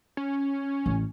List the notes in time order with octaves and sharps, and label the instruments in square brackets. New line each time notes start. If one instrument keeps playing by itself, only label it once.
[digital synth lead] C#4
[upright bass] A1